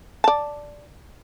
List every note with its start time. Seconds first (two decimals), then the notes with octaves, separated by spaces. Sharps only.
0.24 D5 A5